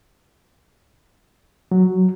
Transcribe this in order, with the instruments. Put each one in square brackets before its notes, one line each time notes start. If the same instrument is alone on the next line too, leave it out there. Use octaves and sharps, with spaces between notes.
[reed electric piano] F#3